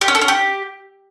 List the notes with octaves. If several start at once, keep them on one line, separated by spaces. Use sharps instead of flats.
G4
C#4
A4
C#4
G4